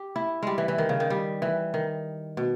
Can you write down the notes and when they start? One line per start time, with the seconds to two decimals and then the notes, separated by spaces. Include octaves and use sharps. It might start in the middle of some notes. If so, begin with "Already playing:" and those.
Already playing: G4
0.16 E4
0.43 G3 G#3
0.58 E3
0.68 E3
0.78 D#3
0.89 C#3
1.00 D#3
1.10 G3
1.42 E3
1.74 D#3
2.37 B2